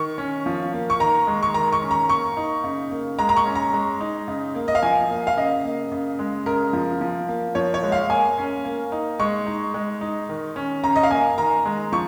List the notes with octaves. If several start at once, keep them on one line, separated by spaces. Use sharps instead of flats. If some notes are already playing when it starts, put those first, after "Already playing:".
Already playing: D#3 C#6
C#4
F3
A#3
C#6
D#3 A#5
G#3
C#6
D#3 A#5
C#6
C#4
A#5
A#3 C#6
D#4
C#3
A#3
G#3 A#5
A#5
C#6
C#4
A#5
G#3
D#4
C#3
A#3
D#5
F5
F3 G#5
A#3
F5
C#3 D#5
A#3
C#3
G#3
C#3 A#4
F3
F3
A#3
F3 C#5
C#5
G#3
F5
A#3 G#5
C#4
A#3
D#4
G#3 C#6
D#4
G#3
D#4
D#3
C#4
C#3 A#5
D#5
F5
A#3 G#5
D#3 A#5
G#3
F3 C#6